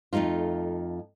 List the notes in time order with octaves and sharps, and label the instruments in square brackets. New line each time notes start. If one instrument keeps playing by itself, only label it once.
[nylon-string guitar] F2 A3 A#3 D#4 F4